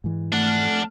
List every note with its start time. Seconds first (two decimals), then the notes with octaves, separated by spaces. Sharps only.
0.04 G#2 E3 G#3
0.32 F2 A3 D4 F#5 F6